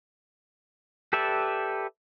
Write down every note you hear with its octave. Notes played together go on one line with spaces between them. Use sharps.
G4 A4 B4 D5 E5